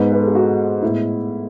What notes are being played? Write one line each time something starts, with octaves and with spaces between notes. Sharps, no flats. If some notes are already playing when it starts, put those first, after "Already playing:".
Already playing: G#2 G#3 B3 B4
B4
A4
G#4
F#4
A2 G#3 B3 E4